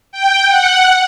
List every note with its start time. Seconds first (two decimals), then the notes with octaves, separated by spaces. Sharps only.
0.12 G5
0.48 F#5